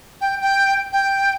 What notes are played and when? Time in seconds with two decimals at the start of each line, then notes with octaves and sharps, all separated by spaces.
0.21 G5
0.41 G5
0.93 G5